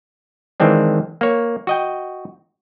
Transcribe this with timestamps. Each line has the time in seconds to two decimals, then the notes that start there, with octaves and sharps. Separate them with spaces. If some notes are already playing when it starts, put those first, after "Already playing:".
0.60 D#3 E3 G#3 C4 D4
1.21 A#3 C#5
1.67 F#4 D#5 G5